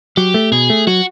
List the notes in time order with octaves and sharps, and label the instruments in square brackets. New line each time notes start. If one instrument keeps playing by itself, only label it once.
[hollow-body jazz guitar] F#3 [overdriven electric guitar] G4
[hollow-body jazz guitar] A3
[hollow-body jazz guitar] B2 [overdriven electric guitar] G#4
[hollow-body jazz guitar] A3
[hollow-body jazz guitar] F#3 [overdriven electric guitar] F#4